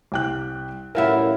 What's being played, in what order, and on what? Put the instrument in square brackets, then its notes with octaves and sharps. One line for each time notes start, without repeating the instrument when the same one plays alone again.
[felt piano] C2 G5 F#6
[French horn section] F#2 A2 [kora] E3 G3 E4 [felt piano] A#4 F5 F#5